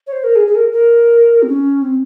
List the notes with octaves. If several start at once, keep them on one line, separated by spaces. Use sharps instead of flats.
C#5
C5
A#4
G#4
G#4
A#4
A#4
C4
C#4
C4